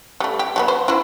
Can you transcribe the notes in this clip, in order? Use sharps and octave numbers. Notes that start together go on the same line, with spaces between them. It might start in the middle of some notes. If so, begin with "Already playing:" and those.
G3 A3
G4
F#3 A3 B3
C5
E4 F#4 C5